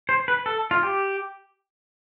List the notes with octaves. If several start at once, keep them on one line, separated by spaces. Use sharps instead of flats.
C5
B4
A4
F4
G4